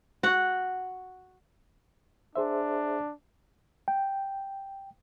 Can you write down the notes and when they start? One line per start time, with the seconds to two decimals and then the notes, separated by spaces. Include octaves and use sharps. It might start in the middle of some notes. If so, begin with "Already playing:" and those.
0.23 F#4 F#5
2.36 D4 G#4 C5 E5
3.88 G5